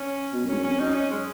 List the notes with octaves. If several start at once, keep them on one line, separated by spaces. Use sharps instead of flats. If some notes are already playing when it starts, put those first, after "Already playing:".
Already playing: C#4
B2
F#2
G#2 C#4
F#2
F2 C#4
F#2 D#4
C#4
G#3